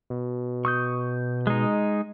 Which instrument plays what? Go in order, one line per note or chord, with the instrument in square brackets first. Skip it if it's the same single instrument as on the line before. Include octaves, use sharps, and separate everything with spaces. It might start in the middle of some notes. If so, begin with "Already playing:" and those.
[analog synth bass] B2
[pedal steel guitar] C#6 D#6 G6
G#3 D#4